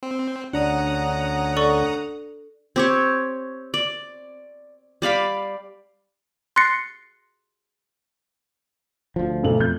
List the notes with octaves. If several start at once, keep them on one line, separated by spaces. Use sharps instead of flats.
C4
D2 C#4 D4 F#5 A#5 D#6
A4 D5 C#6
C4 G4 C#5
D5
G3 D5 F5 B5
C6 F#6 A6 A#6 C7 C#7
D2 F3
B1 A3 F#7
F2 G6